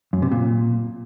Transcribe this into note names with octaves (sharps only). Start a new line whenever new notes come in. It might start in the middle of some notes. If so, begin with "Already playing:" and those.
F#2
C3
A#2